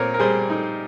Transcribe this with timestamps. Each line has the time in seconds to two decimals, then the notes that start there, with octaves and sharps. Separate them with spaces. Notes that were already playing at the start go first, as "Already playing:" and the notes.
Already playing: A#2 C4 A#4 C#5
0.14 A#4
0.20 G3 G#4 C5
0.50 D#4